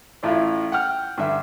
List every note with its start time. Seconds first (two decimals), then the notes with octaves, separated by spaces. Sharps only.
0.23 A1 A2 F4 E5 F5
0.72 F#5 G5 F6
1.18 G2 D3 E5